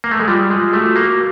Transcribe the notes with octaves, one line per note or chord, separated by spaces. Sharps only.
A#3
A3
G#3
G3 F4
G#3
A3 F#4
A#3